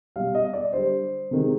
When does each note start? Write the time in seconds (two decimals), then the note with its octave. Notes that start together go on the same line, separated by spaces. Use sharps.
0.16 B2 G3 F5
0.35 D#5
0.53 D5
0.73 D3 G3 C5
1.31 C3 D#3 G#3